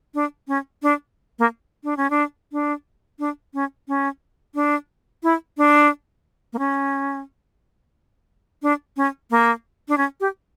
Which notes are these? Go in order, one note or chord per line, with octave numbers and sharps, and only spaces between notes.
D4
C#4
D4
A#3
D4
C#4
D4
D4
D4
C#4
C#4
D4
E4
D4
A#3
C#4
D4
C#4
A#3
D4
C#4
G4